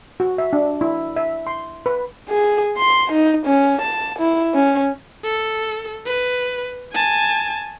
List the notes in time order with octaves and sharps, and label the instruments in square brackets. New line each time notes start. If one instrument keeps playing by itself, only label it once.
[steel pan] F#4
E5
D4
E4
E5
C6
B4
[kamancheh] G#4
C6
D#4
C#4
A5
E4
C#4
[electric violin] A4
B4
G#5 A5